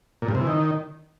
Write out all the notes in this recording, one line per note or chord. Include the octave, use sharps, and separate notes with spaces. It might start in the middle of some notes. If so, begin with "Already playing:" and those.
A#2
G2
C3
E3
D#3